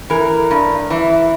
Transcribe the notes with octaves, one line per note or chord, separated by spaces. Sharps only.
E3 A#4
G2
E3